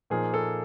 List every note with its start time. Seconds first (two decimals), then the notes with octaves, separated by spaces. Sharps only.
0.10 A#2 F3 A#3 D#4 G#4
0.34 A4